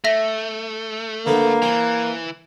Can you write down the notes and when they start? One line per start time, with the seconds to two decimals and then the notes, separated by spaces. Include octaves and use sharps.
0.04 A3 E5 A#6
1.26 D3 A#3 B3 A4
1.62 E3 C5